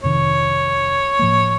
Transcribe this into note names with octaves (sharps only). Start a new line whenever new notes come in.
F2 C3 D#3 C#5
A2 F3 A#3